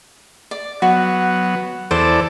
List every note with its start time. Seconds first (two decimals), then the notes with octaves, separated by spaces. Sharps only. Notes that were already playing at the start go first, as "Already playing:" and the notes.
0.51 D5
0.82 F#3 B3 F#4
1.91 E2 A4 C5 D5